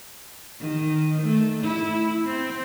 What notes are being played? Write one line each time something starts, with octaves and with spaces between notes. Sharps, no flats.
D#3
A3
E4
C4